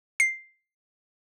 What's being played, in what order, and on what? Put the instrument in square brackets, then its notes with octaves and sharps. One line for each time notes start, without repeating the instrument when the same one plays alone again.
[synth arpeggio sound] C7